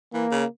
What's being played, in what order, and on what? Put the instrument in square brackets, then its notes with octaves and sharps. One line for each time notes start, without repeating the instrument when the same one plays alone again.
[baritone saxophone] E3 [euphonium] A#3
[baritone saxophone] C#3